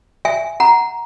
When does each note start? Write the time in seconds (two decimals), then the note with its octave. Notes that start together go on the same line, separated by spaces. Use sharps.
0.25 E5 G#5
0.60 F#5 A#5